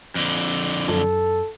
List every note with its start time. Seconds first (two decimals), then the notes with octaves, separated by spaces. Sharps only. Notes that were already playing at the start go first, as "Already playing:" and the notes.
0.15 F2 D3
0.88 F#2 A4